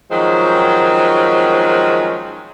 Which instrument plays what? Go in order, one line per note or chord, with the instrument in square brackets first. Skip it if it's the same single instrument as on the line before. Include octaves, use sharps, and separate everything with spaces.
[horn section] D#3 F3 F#3 G#3 C4 C#4